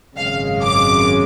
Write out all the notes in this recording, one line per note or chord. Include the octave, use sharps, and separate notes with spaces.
G#1 F#2 C#3 G#3 F5
D6